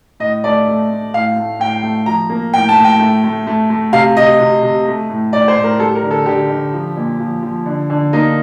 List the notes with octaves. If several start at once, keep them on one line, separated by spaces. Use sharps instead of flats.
A2 D#5
A3 D5
A3
A3
A2 F5
A3
A2 G5
A3
F3 A#5
A#3
A2 G5
A5
A2
G5
A3
A3
A3
A3
C3 F5
C3 D#5
C3
C3
A3
A2
A2 D5
C5
A2
A#4
G3 A4
A#4
D3
A4
D3 G4
D3
F3
A#2
F3
F3
D3
D3
A#3 D#4